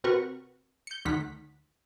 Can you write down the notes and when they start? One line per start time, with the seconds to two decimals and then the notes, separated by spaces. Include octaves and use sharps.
0.04 C3 C4 F#4 A#4 B4 C#6
0.87 G6 C#7
1.05 D2 D#3 F#5 B6